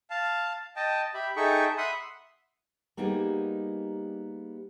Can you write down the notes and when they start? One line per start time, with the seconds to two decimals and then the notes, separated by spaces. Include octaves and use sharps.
0.10 F5 A5
0.76 D#5 G5 A5
1.14 G4 E5 B5
1.36 D#4 G#4 A4 E5 G5 C#6
1.77 E5 F#5 B5 C6 D#6
2.97 G3 A#3 B3 D#4 G4 G#4